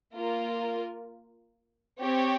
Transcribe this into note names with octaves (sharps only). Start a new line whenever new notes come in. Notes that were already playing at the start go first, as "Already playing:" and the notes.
A#3 F4 A#4
C4 G4 C#5